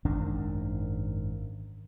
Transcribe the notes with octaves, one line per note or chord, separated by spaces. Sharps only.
G#1 F#2 D#3 D4